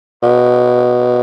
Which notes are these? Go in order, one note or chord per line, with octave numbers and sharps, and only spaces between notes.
B2